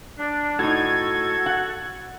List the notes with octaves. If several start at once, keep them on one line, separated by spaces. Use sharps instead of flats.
D4
A2 D#4 F#4 A4 G#6
F#5